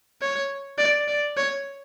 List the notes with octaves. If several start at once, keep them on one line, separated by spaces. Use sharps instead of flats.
C#5
D5
D5
C#5